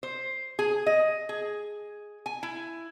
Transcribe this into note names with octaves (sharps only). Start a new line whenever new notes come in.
C5
G#4
D#5
G#4
G#5
E4